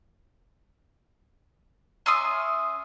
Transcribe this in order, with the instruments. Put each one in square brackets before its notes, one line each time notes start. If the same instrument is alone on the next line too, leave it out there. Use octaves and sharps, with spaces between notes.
[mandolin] C#4 E5 C6 D#6